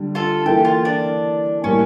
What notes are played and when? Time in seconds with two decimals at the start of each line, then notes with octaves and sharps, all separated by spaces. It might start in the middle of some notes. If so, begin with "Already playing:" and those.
Already playing: D3 G3
0.15 F4 A4
0.46 E3 A#3 E4 G4 A4
0.65 F4
0.85 D4
1.63 A2 G3 A#3 C#4 E4